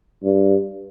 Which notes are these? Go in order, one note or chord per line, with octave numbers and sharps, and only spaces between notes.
G2